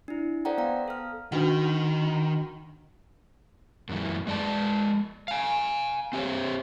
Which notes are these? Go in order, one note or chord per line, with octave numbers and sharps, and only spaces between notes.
D4 E4
A4 C5 D5 F#5 G5 A#5
B3 F5 A#5
A4 F6
D#3 D4 F#4 F#5
F#2 E3
G#3 D5 A5
F5 G#5
C4 G4 G#4 C5 C#5